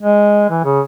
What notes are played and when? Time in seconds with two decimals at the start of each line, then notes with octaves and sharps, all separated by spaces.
0.02 G#3
0.49 E3
0.64 C#3